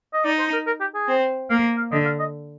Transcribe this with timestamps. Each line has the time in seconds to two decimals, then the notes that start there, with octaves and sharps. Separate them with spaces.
0.13 D#5
0.25 D#4 D5
0.39 C5
0.52 A#4
0.67 A#4
0.80 G4
0.94 G#4
1.08 C4
1.50 A#3 F5
1.77 F5
1.91 D3 D#5
2.05 F5
2.19 D#5